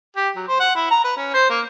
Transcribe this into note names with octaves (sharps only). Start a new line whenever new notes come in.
G4
F#3
C5
F#5
E4
A#5
B4
C#4
C5
A#3